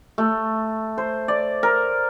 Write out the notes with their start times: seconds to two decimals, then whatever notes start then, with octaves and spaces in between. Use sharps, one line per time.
0.18 A3
0.98 C5
1.28 D5
1.63 A#4